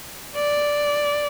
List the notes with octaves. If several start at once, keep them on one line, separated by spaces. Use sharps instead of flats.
D5